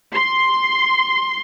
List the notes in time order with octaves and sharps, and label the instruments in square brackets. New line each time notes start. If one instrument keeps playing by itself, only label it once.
[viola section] C6